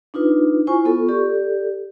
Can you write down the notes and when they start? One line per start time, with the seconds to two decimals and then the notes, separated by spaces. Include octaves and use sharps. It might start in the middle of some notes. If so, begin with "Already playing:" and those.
0.14 D4 D#4 F4 B4
0.67 E4 F4 C5 G#5 C#6
0.85 B3 F4 A4 C#6
1.09 G4 A4 D5